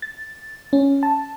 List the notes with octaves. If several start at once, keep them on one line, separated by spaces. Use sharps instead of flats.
A6
C#4
A5